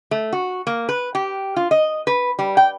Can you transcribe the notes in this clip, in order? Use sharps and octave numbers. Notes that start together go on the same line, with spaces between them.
A3
F#4
A#3
B4
G4
F4
D#5
B4
G3
G5